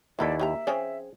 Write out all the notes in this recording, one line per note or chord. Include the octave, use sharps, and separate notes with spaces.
D#2 A#3 D#4 E4 A4 D5
A#3 G4 E5 A#5
F3 C4 C#4 G#4